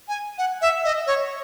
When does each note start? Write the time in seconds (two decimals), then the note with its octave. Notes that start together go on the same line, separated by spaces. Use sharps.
0.08 G#5
0.38 F#5
0.62 E5
0.85 D#5
1.07 C#5